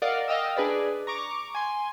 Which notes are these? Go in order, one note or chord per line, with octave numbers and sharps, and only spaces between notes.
A#4 D5 D#5 F5 F#5
D#5 F5 G5 D#6 E6
D4 G#4 B4 D5
A#5 C#6 D6
G#5 C6